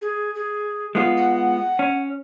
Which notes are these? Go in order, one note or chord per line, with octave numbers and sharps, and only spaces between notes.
G#4
G#4
G#3 B3 F4
F#5
C#4